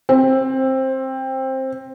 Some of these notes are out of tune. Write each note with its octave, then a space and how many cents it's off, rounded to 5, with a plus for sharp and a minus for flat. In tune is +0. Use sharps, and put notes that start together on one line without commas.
C4 +15